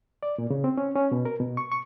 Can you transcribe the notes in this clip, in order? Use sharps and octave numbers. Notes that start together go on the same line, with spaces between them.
D5
A#2
C#3
C4
C#4
C#4
B2
A#4
B2
C#6
C#6